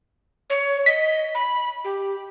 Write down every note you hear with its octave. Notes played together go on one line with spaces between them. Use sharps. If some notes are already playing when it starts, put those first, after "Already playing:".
C#5
D#5 B6
B5
G4